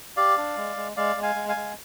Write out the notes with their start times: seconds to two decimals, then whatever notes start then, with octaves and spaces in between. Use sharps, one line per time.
0.17 G4 D5 F5
0.37 D4
0.57 G#3
0.77 G#3
0.97 G#3 D5 F5
1.16 G#3
1.23 F5 G#5
1.35 G#3
1.48 F5 G#5
1.56 G#3